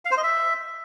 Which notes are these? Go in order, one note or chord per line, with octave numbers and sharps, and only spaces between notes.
F5
C5
D#5
E5